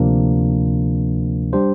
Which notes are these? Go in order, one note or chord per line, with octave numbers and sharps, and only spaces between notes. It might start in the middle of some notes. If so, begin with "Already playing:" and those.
Already playing: D2 C3 F3 A#3 D4
G3 D4 G4 C5